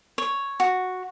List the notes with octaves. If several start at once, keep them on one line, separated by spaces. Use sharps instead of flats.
C#5
F#4